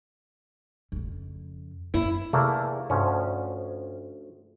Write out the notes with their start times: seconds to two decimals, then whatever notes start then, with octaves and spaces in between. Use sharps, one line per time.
0.92 F2 C#3
1.94 F#2 E4
2.33 E2 C3 A3 A#3
2.90 D2 G2 F3 C#4